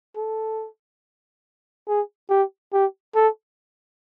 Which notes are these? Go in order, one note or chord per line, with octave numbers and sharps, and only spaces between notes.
A4
G#4
G4
G4
A4